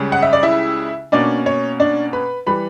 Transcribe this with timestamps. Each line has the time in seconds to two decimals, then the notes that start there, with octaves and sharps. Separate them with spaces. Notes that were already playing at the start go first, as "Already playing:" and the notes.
Already playing: C#2 C#3 G3 C#4
0.12 F#5
0.22 E5
0.33 D5
0.43 E4 E5
1.12 B2 A#3 C#4 D4 D5
1.46 C#5
1.80 D4 D5
2.13 B4 B5
2.46 E3 G3 B4 B5